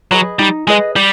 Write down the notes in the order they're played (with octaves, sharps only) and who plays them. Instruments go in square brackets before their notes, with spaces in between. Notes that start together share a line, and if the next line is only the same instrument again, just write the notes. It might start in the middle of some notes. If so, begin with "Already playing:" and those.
[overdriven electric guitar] F#3 [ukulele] G#4 B4 D#5
[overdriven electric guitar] G3 [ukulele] D#4
[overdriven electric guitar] G#3 [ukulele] G#4 B4 D#5
[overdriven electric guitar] G3 [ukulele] G4